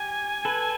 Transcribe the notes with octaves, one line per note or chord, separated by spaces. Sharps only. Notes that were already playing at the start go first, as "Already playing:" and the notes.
Already playing: G4 G#5
A4 B4